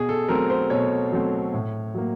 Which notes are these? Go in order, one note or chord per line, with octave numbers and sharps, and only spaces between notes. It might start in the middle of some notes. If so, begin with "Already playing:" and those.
Already playing: B2 G#4
A4
F#3 A3 C4 A#4
C5
B2 C#5
F#3 A3 C4
A2
F#3 A#3